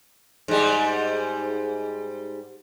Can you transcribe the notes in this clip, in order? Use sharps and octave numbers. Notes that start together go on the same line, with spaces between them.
G#2 G3